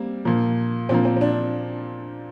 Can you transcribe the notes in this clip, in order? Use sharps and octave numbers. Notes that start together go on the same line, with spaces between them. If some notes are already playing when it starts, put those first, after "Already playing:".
Already playing: G3 A#3 C4
A#2 F3 A#3
A#2 F3 A#3 C4
C4
C4
D4